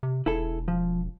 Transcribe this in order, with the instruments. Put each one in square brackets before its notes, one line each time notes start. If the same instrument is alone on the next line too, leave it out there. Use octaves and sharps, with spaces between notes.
[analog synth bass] C3
[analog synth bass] E1 [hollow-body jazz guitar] E4 G#4 A4
[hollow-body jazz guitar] F3